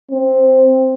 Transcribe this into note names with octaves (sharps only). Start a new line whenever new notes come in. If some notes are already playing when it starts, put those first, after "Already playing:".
C4